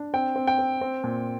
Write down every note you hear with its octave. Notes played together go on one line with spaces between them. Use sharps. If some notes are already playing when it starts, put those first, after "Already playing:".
Already playing: D4
C4 G5
C4
G5
C4
C4
A#2